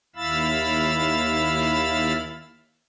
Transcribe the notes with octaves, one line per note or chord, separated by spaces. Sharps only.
D#2 E4 F5 B5 E6 A6